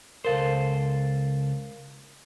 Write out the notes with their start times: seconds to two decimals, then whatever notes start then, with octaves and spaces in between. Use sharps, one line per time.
0.25 C#2 A4 A#4 C5 F5